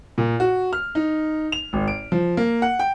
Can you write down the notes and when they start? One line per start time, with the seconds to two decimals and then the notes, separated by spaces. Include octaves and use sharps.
0.18 A#2
0.40 F#4
0.73 F6
0.95 D#4
1.52 F7
1.73 G#1
1.88 D7
2.12 F3
2.37 A#3
2.62 F#5
2.79 G5